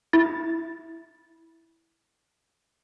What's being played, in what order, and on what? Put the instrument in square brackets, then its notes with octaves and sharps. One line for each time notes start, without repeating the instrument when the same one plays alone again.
[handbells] E4 A6